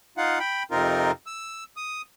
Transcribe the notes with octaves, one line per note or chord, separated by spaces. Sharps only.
D#4 F4 F5 F#5
G5 B5
F2 C3 C4 D#4 F4 A#4
E6
D#6